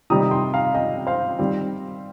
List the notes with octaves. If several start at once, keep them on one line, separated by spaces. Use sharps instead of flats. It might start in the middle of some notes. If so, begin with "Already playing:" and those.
C3 D#3 G3 C4 D#4 A#5 D#6
G5 C6
F5 A#5
D#5 G5
C5 F5
D#3 G3 C4